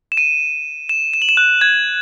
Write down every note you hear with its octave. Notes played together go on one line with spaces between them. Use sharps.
E7
D#7
E7
E7
F#7
E7
F#6
G#6